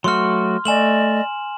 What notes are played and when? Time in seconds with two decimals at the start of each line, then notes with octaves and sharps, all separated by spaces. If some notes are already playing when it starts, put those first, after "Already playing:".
0.04 F#3 A3 F#4 C6 F6
0.65 A3 D5 D#5 G#5 E7 F#7